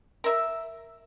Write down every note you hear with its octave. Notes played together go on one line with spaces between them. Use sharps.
A#4 E5